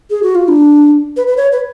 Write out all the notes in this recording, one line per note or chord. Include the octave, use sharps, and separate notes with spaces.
G#4
F#4
F4
D4
B4
B4
C#5
B4